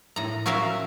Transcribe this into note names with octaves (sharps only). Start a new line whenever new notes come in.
A2 A#5
C#4 F#4 A#4 E5 F5